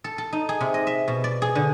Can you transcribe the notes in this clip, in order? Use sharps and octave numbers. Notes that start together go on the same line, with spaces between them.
A4
A4
D#4
G#4
C3
D#5
E5
B2
D5
G#4
D3